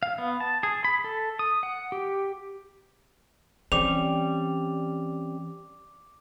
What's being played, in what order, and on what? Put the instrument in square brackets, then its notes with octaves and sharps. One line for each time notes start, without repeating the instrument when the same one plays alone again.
[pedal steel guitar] F5
B3
A5
G#4
B5
A4
D#6
F#5
G4
[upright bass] E3 [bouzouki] G3 [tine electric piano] C4 C#4 [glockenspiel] D6 F7